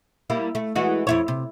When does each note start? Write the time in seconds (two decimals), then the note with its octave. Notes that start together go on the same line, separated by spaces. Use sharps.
0.30 G3 A#3 E4
0.55 A3
0.76 E3 G#3 F#4
1.07 F2 E4 C#5
1.28 C3